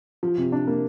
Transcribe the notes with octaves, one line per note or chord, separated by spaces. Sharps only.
F3
C3
D4
A#3